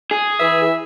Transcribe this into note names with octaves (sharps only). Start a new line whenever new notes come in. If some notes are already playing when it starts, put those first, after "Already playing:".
G#4
E3 E5